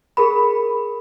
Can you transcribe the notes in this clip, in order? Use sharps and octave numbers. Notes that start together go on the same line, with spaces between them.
G#4 A#4 B5